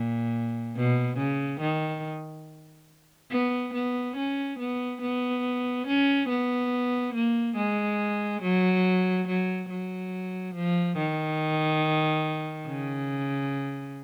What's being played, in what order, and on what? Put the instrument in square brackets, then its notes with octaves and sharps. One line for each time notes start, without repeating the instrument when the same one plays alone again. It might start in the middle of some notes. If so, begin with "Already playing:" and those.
Already playing: [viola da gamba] A#2
B2
C#3
D#3
B3
B3
C#4
B3
B3
C#4
B3
A#3
G#3
F#3
F#3
F#3
F3
D#3
C#3